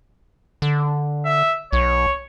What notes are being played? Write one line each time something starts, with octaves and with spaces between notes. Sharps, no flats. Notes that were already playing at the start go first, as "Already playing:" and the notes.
D3
E5
B1 C#5